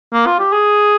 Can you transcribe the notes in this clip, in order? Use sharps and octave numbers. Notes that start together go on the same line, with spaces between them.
A#3
F4
G4
G#4